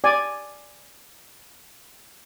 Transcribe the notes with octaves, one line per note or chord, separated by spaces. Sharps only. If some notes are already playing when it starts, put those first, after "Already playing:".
D5 G#5